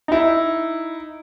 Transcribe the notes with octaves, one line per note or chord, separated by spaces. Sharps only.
D#4 E4